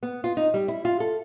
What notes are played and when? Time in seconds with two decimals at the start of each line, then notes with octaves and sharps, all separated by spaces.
0.03 B3
0.24 F4
0.37 D#4
0.54 G3
0.68 E4
0.85 F4
1.00 A4